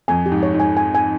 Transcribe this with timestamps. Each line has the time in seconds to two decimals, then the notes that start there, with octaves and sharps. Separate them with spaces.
0.08 F2 G#5
0.26 G4
0.32 G#2
0.43 C#5
0.54 G#2
0.60 G#5
0.77 G#5
0.95 G#5